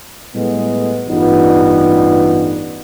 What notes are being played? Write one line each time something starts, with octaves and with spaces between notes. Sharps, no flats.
A2 G3 G#3 B3
A1 G2 G3 B3 D#4 F4